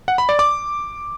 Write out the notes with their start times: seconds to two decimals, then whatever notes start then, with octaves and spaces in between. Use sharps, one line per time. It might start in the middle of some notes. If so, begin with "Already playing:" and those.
0.08 F#5
0.18 B5
0.29 D5
0.39 D6